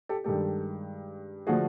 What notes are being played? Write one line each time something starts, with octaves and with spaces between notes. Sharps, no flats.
G4 A4
G2 D#3 G#3 G4 A4
D3 F3 A3 F#4 G#4